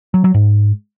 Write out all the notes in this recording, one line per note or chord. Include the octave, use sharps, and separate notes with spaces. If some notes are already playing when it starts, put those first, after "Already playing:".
F#3
F#3
G#2